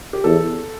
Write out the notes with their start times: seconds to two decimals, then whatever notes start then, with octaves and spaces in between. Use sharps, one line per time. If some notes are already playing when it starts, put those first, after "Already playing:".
0.13 G4
0.24 E2 A4